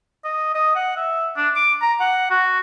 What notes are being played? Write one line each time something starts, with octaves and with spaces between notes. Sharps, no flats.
D#5
D#5
F#5
E5
D4
D6
A#5
F#5
F#4